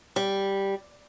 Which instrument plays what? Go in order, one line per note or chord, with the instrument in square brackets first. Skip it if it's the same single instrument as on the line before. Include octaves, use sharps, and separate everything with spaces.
[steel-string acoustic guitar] G3